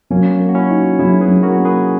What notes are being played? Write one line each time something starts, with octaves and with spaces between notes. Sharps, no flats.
F#3 A#3 C#4
A#3
F#4
C#4 E4
D#4
F#3 E4 G#4
G#4 B4
F#3
F#4 A#4
A#3
G#4 B4